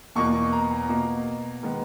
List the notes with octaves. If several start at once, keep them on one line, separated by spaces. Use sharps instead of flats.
E2 B2 A#3 C#6
A#5
B2 A#3
D#3 G#3 B3